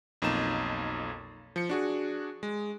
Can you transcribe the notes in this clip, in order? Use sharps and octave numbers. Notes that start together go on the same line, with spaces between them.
B1 F2 A#3 D#4 A#5 E7
F3 C#7
D4 F#4 G#4
G#3